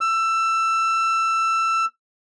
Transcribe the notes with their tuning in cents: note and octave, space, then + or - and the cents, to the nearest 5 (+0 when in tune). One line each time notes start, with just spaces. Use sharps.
E6 +20